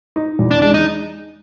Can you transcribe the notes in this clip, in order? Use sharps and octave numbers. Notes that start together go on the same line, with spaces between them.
D#4
E2
D4
G#3 D4
D#4